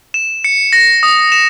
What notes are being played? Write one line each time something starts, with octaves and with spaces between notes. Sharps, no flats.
E7
C#7
A#6
D#6
E7